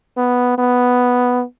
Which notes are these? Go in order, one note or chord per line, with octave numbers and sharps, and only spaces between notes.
B3
B3